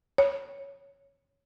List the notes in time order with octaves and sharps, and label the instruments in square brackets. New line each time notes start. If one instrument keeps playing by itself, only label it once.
[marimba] C#5